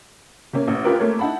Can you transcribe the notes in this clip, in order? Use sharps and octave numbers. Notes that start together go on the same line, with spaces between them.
C3 A#3 C#4
A1
F4 G4 A#4 B4
A3 A#3 C4 A#4 C#5
D#4 E4 F#5 A5 B5